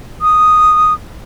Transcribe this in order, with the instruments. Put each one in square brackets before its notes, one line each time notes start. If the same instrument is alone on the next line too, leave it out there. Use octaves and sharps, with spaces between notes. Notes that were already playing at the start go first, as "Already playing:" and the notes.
[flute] D#6